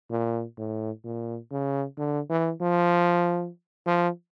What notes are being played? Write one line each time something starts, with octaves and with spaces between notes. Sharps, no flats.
A#2
A2
A#2
C#3
D3
E3
F3
F3